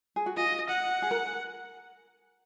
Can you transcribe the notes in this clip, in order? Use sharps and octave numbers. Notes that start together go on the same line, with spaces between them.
G#4
F#4
F4 D#5
F#5
G#4
A#4